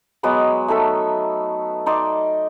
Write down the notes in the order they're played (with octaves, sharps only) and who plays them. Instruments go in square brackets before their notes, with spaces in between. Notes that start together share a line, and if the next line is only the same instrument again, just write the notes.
[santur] F#3 G#3 B3 D6
A3 D#4 A4 E5
D#4 D5 C6 D6